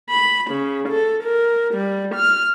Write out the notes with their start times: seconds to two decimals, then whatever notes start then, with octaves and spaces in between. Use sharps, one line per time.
0.11 B5
0.51 C#3
0.89 A4
1.24 A#4
1.74 G3
2.15 F6